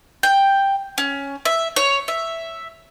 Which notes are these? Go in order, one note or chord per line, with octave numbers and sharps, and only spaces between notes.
G5
C#4
E5
C#5
E5